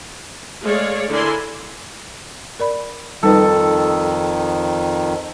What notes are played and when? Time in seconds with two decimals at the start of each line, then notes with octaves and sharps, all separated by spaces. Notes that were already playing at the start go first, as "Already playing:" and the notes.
0.62 G#3 A3 G#4 C#5 D5 F5
1.09 D3 E4 A#4 D5 G#5 C6
2.60 A#4 D5 B5
3.23 F2 D#3 G3 D#4 A4 B4 D#5